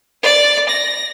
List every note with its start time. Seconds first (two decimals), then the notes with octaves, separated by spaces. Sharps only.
0.23 D5
0.70 A#6